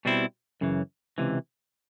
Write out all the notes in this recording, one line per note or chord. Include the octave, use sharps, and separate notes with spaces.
B2 G3 C4 E4
F#2 C#3 E3
C#2 C3 E3